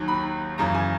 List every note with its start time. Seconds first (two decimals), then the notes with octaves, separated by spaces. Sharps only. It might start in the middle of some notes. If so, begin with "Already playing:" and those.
Already playing: D#2 D#3 F#3
0.08 B5
0.58 F#2 C#3 E3 A#5
0.75 G#5